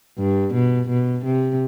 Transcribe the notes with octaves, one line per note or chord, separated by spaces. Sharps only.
G2
B2
B2
C3